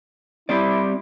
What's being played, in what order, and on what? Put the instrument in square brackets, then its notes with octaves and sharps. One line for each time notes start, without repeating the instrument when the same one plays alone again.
[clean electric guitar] G3 C4 D5 [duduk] E4